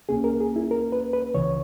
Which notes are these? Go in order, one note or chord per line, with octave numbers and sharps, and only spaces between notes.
C#2 B2 A#3 C#4 G#4
A#4
G#4
E4
A#4
B4
B4
C#2 C#3 E3 C#5